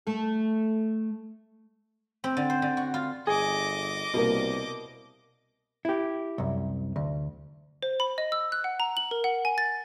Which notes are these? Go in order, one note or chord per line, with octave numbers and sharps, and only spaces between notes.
A3 A4
C4
D3
C5
D3
F#4
F4
G1 G#4 D#5 D6
C2 B2 A#3
E4 G4
C2 F#2
D2
C5
B5
D#5
E6
F#6
F#5
A#5
F#7
A#4
F#5
G#5
A6